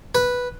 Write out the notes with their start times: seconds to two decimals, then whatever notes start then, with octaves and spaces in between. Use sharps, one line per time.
0.15 B4